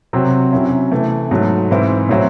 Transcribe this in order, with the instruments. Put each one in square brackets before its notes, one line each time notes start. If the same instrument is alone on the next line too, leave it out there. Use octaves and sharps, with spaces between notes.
[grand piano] C3 F#3 C4 F#4
C3 F#3 C#4 E4
C3 E3 A3
G#2 F#3 A3
G#2 E3 C4 E4
A2 F#3 C4 E4